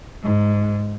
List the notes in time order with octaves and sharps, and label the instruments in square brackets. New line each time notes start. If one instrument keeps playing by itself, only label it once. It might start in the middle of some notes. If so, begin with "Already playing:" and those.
[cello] G#2